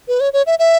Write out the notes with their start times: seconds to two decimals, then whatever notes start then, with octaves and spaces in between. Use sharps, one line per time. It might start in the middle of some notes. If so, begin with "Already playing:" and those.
0.08 B4
0.20 C#5
0.33 C#5
0.46 E5
0.59 E5